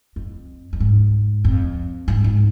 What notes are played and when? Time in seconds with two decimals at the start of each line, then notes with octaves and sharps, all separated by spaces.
0.16 F2
0.73 F2
0.80 G#2
1.45 F2
2.08 G#2
2.24 G#2